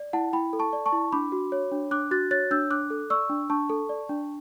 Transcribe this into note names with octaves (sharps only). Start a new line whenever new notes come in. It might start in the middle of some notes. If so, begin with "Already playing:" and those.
Already playing: D5
E4 F#5 A5
E4 G5 B5
A4
A5 C#6
D5
A5 C#6
E4
D4 B5 D6
F#4
C#5
D4
D4 D6 F#6
F#4 F#6 A6
C#5 F#6 A6
D4 E6 G6
D4 D6 F#6
A4
D5 C#6 E6
D4
D4 A5 C#6
A4
D5
D4